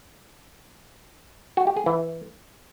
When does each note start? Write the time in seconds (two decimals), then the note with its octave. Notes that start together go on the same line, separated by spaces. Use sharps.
1.57 F#4
1.67 G4
1.77 G#4
1.86 E3